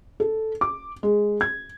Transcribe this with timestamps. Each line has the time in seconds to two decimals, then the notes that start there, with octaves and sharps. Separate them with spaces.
0.20 A4
0.61 D6
1.03 G#3
1.41 G#6